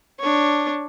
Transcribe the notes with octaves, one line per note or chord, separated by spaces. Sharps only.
D4 C#5